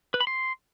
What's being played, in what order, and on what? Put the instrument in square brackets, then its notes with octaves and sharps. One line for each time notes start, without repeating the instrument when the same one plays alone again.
[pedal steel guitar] B4
B5
C6